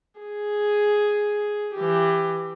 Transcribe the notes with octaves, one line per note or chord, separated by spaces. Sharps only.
G#4
E3 G4